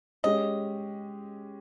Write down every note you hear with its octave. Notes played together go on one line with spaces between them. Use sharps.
G#3 C#4 G4 D#5